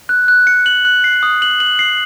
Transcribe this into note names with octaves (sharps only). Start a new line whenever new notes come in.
F#6
F#6
C#7
F#7
F#6
C7
D#6
F#7
F#7
C7